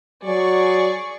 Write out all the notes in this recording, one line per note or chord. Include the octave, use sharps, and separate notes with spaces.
F#3 G#4 D5 C#6